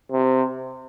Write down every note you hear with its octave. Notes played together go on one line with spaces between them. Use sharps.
C3